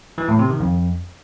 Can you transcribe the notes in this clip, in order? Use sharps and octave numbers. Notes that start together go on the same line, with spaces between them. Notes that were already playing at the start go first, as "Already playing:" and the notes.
E3
A2
C3
D#3
F2